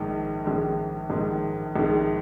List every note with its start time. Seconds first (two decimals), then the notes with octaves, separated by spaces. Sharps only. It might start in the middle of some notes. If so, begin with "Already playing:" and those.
Already playing: A#1 G#2 D#3 G#3
0.45 A#1 G#2 D#3 G#3
1.10 A#1 G#2 D#3 G#3
1.76 A#1 G#2 D#3 G#3